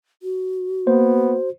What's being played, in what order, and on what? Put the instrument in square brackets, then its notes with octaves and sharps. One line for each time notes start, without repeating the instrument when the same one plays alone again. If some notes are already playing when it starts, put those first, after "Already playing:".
[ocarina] F#4
[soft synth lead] A#3 [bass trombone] B3 [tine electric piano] C5